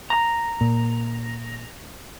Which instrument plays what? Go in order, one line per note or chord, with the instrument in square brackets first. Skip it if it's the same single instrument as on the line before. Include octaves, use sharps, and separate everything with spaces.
[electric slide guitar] A#5
[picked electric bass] A#2